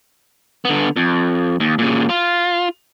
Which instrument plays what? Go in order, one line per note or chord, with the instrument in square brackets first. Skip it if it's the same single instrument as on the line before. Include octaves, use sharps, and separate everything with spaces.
[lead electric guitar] D3 B3
F2
D#2
A#2 C#3
F4